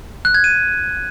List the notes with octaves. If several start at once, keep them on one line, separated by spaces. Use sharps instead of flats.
F#6
G#6
D#7